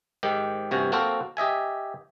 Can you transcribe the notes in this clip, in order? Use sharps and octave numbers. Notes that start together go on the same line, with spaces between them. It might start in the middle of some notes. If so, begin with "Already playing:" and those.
G#2 D#3 G4
A1 G2 C3 F#4 G#5
A#3 C4 F#4 A4 A#4 C5
G4 D#5 E5 G#5